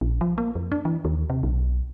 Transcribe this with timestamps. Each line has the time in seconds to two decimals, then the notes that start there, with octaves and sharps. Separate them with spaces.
0.01 A#1
0.21 F3
0.38 A#3
0.55 F2
0.72 D4
0.85 E3
1.05 D#2
1.30 C3
1.43 B1